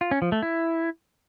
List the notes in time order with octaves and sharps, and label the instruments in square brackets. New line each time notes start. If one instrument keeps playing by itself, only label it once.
[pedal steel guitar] F4
C#4
F3
A3
E4